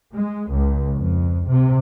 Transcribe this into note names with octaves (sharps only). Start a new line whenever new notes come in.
G#3
C#2
F2
C3